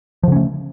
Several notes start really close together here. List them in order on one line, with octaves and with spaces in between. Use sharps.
F3 C#3 C#4 A3